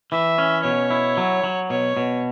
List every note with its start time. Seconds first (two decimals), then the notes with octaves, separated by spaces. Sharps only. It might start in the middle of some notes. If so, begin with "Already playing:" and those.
0.12 E3 E5
0.38 C#4
0.64 B2 C#5
0.91 E4
1.17 F#3
1.44 F#3
1.70 B2 C#5
1.97 B2